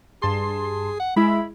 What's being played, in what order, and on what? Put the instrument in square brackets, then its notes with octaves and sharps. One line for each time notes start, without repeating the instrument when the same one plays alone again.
[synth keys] G2 A5 C6 [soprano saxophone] G#4
[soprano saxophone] F#5
[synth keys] G#3 E4 [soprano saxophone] B5